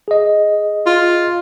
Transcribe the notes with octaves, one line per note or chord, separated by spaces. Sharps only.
G#4 D#5
F4